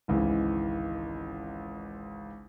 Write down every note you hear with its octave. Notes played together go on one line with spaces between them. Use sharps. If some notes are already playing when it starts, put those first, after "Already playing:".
G#1 C#2 E3 G#3